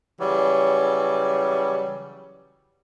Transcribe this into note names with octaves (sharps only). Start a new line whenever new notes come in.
C#3 E3 F#3 G3